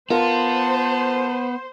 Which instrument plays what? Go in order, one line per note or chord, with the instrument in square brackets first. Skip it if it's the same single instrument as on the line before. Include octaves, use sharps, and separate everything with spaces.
[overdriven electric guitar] B3 [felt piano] F4 A#4 [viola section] C5 [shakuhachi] A5